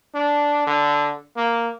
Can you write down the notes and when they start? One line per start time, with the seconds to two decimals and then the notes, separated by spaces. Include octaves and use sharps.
0.14 D4
0.67 D3
1.37 A#3